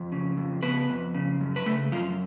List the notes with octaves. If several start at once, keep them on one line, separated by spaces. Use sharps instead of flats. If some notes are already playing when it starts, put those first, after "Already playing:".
Already playing: F2
C#3
F2
C#3 B3 B4
F2
C#3
F#2
B4
C#3 A3 A4
F#2 F3 F4